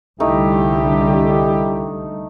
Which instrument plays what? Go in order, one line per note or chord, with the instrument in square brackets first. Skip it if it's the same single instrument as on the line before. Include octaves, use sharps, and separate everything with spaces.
[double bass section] C2 D3 G3 [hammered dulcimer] A3 D#4 [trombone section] E4 G4